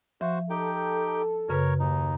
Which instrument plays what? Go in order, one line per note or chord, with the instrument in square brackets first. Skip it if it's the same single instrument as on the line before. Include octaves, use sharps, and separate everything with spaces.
[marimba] F3 E5 [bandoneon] F#4 C5
[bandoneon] D#4 G4 G5 [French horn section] A4
[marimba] F#2 C#3 B4 [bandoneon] A#4 C#5
[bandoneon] D#2 D#4